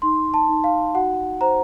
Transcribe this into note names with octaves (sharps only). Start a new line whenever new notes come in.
D#4 C6
A5
D#4
F5
F#4 F#5
C5 A#5